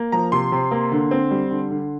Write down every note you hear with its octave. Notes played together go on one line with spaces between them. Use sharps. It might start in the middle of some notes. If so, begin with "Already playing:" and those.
Already playing: A#3
F3 A#5
C3 C6
C3
A#3
D3
C4
G3
D3
D3